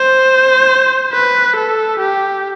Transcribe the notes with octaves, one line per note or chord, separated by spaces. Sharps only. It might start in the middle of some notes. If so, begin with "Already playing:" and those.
Already playing: C5
B4
A4
G4